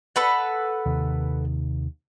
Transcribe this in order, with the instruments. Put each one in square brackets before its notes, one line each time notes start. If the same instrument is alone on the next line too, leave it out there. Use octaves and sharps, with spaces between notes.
[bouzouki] A4 B4 F#5
[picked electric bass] D#2 C3 D#3